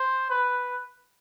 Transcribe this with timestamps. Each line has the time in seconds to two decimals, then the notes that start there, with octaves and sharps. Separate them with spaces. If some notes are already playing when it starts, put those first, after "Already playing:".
Already playing: C5
0.30 B4